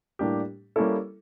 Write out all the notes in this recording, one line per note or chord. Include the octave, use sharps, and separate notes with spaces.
A2 G3 A#3 D4 G4
G3 A#3 C#4 E4 A4